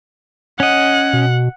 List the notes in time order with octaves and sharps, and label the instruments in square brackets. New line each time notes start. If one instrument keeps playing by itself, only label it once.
[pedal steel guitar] C#4 D#5 [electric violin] F#5
[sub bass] B2